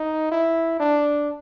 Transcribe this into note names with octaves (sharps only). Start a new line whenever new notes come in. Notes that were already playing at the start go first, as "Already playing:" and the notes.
Already playing: D#4
E4
D4